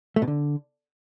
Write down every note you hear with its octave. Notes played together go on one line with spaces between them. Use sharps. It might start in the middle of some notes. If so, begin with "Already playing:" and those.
A3
B2
D3